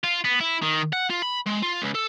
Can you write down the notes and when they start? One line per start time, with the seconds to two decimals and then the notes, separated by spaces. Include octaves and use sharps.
0.04 F4
0.24 B3
0.40 E4
0.62 D#3
0.93 F#5
1.10 F4
1.22 B5
1.46 G#3
1.62 F4
1.82 C#2
1.94 A4